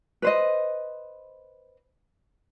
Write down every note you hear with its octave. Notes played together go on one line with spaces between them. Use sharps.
B4 C5 D#5